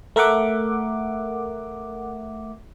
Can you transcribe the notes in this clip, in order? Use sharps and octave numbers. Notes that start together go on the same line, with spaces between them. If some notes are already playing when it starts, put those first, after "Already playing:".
A3 A#4 E5 F#5 D6